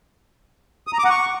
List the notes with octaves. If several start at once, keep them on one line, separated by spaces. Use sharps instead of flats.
D#6
A#5
D6
F#5
C#6